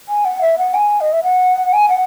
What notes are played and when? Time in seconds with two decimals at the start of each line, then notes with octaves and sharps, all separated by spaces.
0.09 G#5
0.25 F#5
0.41 E5
0.58 F#5
0.74 G#5
1.01 D#5
1.13 E5
1.23 F#5
1.73 G#5
1.89 F#5